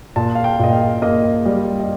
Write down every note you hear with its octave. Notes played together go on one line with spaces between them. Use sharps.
A#2 A5
F5
G5
A#2 D#5
F5
A#3 D#5
G3
D#5